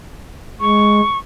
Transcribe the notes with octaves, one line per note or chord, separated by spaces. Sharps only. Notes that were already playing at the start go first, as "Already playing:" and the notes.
G#3 C#6